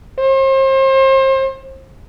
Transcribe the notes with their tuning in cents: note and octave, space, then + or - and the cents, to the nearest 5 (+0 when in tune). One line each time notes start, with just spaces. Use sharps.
C5 +35